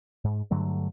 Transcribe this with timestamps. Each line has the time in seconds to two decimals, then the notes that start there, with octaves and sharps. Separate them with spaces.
0.24 G#2
0.51 G2 D3 F#3 A3